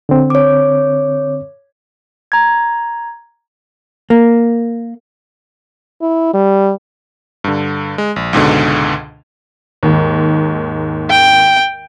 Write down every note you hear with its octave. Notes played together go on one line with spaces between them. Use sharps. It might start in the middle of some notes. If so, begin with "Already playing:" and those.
D3 C4
C#5 D6
A#5 G#6
A#3
E4
G3
G2 D3
G#3
A#1
C#2 G#2 B2 D3
D#2 G#2
G5